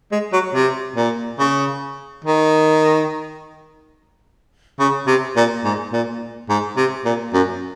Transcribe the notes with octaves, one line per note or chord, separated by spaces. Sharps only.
G#3
F#3
C3
A#2
C#3
D#3
C#3
C3
A#2
G#2
A#2
G#2
C3
A#2
F#2